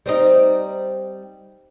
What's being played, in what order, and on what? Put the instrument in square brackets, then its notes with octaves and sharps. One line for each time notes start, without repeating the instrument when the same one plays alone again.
[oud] G3 C4 D#4